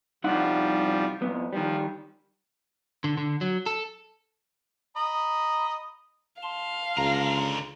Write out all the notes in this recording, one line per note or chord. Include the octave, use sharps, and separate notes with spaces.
C2 F3 G3 D#4 F#5
F2 G#2 B3
D#3 F3 G3
D3
D3
F#3
A4
D#5 A#5 B5
F5 A5 C6
C#2 D3 A#5